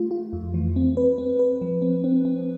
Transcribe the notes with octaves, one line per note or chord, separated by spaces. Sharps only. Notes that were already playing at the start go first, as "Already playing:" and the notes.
Already playing: A3 F4
F4
F2
E3
C4
B4
C4
B4
F3
C4
C4
C4